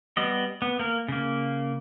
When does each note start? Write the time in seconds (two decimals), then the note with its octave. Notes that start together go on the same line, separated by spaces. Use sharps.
0.17 G3 B3 D#5
0.62 B3
0.79 A#3 A#4
1.08 C#3 A#3